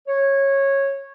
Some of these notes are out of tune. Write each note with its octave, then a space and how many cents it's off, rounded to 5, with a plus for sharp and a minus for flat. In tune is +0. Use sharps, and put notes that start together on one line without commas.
C#5 -15